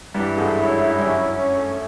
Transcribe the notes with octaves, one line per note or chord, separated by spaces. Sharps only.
G2 E3 G3
G#2 G#3 A3
F#2 F#3 E4
E4
G3
F#2 F#3 C#4
C#4
A3